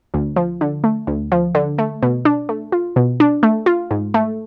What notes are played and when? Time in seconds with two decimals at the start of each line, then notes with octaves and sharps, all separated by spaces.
0.14 D2
0.36 F3
0.61 D3
0.84 A3
1.07 D2
1.32 F3
1.55 D3
1.78 A3
2.02 B2
2.25 D4
2.49 A3
2.72 F4
2.96 B2
3.20 D4
3.43 A3
3.66 F4
3.91 G#2
4.14 A3